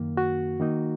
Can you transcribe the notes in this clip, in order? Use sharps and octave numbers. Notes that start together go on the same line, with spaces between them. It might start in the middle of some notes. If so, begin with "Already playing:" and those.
Already playing: F#2 D#3 A#3
F#4
D#3 A#3 D#4